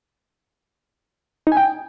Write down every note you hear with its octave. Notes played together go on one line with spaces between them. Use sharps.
D#4
G#5
G5